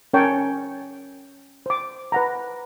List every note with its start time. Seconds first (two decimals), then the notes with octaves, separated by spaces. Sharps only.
0.14 C#4 A#4 C#5 G5 A5 C#6
1.66 C5 D6
2.12 B4 F#5 A#5